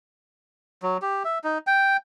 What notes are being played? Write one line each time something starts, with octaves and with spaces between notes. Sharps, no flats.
F#3
G4
E5
D#4
G5